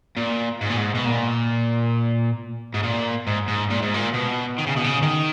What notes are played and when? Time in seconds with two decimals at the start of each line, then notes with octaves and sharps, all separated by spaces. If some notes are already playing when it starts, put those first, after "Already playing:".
0.17 A#2
0.61 G#2
0.70 A#2
0.77 G#2
0.95 B2
1.06 A#2
2.74 G#2
2.83 A#2
3.27 G#2
3.48 G#2
3.71 A#2
3.83 G#2
3.94 A#2
4.14 B2
4.58 D#3
4.67 C#3
4.76 B2
4.84 C#3
5.02 D#3